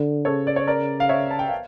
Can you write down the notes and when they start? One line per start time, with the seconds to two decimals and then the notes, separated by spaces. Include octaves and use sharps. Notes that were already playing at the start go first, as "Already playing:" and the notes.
Already playing: D3
0.25 C#3 A4 C#5
0.47 D5
0.56 C#5
0.67 A#4 D5
1.00 F5
1.09 C#5 E5
1.31 A5
1.39 G5
1.48 F5